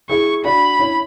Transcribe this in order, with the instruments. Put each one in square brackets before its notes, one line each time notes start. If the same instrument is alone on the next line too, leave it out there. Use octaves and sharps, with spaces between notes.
[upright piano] E4 G#4 [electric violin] C#6
[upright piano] D4 F#4 [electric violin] B5
[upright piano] C#4 E4